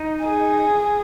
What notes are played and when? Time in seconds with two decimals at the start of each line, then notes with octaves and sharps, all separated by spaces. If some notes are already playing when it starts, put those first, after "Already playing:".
Already playing: D#4
0.23 G#4